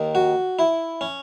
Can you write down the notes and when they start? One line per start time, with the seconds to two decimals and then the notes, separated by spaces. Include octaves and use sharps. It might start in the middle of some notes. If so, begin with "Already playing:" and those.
Already playing: D#2 D#3
0.15 F#4
0.59 E4
1.01 C#4